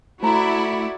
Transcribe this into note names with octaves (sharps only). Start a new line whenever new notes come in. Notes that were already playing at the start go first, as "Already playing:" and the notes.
A3 E4 F#4 C5 D5 A#5